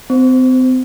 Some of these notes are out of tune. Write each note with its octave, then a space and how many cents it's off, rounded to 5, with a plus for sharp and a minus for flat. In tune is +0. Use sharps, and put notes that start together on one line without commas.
C4 -35 C5 +0